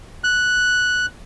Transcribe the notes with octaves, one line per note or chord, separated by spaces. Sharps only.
F#6